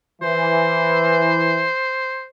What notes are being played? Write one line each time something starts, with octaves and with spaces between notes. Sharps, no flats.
E3 C5